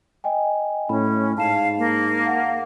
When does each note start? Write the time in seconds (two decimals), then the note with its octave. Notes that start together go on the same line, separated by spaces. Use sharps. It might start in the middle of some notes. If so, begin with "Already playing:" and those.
0.24 D#5 G5 G#5
0.89 A2 C#4 B5
1.38 G#2 F5 A5 E7
1.78 A#3
2.26 F5 F#5